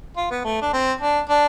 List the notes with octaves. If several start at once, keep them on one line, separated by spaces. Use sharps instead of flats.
F4
B3
A3
D4
C4
D4
D4